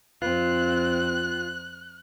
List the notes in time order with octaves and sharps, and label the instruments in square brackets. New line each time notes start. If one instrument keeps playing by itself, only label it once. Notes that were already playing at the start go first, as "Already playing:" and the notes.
[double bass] F2 C4 [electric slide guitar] F4 [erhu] F#6